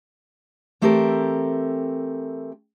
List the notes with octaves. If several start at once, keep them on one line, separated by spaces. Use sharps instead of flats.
E3 A3 C4 G4 A4 A#4